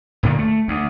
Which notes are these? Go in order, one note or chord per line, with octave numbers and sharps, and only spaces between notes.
D2 A#2 D3 D#3
A3
D2